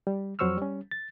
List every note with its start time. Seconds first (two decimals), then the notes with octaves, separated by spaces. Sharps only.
0.07 G3
0.39 F2 F#3 C5 C#6 E6 F6
0.57 G3 C#4
0.91 A6